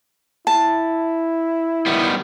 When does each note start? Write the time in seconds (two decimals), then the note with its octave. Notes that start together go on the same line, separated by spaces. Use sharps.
0.47 E4 A5
1.86 D#3 G3 B3